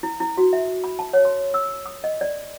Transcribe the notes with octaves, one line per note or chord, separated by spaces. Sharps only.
E4
E4
F#4
E5
B5
A5
C#5
C6
E6
D#6
D#5
D5